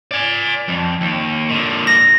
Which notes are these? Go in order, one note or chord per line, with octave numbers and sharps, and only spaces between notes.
D5 G#5
F2
D#2
A#2 D3
A#6